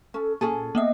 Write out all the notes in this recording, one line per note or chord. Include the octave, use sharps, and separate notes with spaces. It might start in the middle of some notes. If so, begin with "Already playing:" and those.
C#4 A4
A#2 C#4 G#4 A4
A#3 B3 D#5 E5